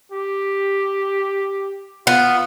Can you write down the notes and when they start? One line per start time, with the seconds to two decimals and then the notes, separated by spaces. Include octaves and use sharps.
0.12 G4
2.07 B3 F4